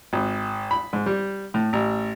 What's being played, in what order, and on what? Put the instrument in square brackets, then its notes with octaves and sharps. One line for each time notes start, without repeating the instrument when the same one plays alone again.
[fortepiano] G#1
B5
G#2
G3
A2
A1